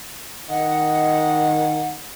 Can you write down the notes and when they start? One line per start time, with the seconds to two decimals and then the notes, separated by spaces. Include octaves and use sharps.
0.49 D#3 D#5 F#5